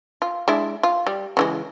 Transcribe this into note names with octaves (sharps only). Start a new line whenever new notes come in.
F4
G#3 D4 E4
F4
G3
C#3 E3 G#3